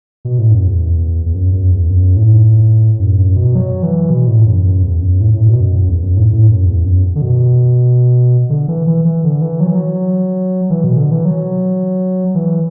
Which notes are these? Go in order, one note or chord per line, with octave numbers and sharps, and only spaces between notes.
B2
A2
F#2
E2
E2
F#2
F#2
E2
F#2
A2
F#2
F#2
B2
F#3
E3
B2
A2
F#2
F#2
E2
F#2
A2
A2
B2
F#2
F#2
E2
F#2
A2
A2
F#2
E2
F#2
D3
B2
D3
E3
E3
E3
D3
E3
F#3
E3
F#3
E3
B2
D3
E3
F#3
E3